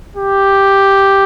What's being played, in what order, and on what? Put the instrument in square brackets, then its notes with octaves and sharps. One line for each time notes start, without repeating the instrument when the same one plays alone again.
[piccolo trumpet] G4